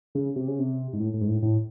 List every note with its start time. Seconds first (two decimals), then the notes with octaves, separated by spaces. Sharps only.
0.15 C#3
0.36 C3
0.48 C#3
0.59 C3
0.93 G#2
1.00 A2
1.14 A2
1.21 G#2
1.28 A2
1.42 A2